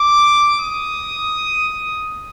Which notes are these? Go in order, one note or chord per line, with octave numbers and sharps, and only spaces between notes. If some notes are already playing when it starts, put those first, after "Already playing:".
Already playing: D6
D#6